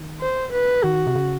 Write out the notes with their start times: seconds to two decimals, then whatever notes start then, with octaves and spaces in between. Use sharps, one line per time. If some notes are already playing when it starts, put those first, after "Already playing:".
Already playing: D#3
0.20 C5
0.53 B4
0.84 D#3 F#4
1.07 C3
1.15 C#3